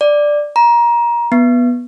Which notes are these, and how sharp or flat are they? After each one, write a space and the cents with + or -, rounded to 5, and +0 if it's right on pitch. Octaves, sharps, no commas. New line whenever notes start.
D5 +5
A#5 +25
B3 -15